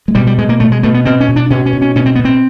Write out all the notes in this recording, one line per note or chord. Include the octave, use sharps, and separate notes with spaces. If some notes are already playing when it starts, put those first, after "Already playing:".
G#3
B2 G3
G3
B2 G#3
A#3
B2 A3
G#3
B2 A3
B3
B2 C4
C#4
B2
D4
B2 C#4
C#4
B2
C#4
B2 C#4
C4
B2 B3
C4